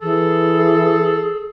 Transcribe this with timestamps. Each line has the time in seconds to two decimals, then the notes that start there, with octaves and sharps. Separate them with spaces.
0.02 E3 G#4 A4